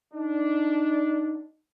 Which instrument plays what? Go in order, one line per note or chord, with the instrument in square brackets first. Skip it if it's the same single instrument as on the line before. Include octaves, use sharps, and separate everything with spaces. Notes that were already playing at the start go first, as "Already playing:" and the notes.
[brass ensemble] D4 [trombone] D#4